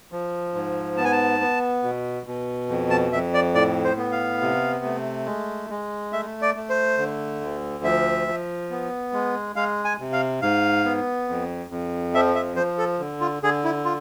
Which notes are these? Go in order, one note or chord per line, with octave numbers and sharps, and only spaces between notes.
F3
G#2
B3 A5
G#5
A5
B3
B2
B2
F2
A5
F2 E5
D5
A2 D5
C5
B3
F5
C3
A3
G#3
G#3
A3 E5
D5
A3
C5
D3
D2
F3 E5
F3
B3
G#3
G#3 F5
G#5
C3
F5
G#2 F5
B3
F2
F2
F3 E5
E5
F3 C5
A4
D3
F4
D3 G#4
E4
F4